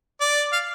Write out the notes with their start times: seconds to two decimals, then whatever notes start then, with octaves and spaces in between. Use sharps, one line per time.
0.21 D5
0.53 F5